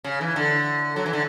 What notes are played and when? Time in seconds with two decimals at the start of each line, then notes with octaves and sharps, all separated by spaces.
0.04 C#3
0.21 E3
0.36 D3
0.96 F#3
1.06 E3
1.13 D3